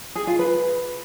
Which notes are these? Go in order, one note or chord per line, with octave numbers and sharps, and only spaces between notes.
G#4
F4
B4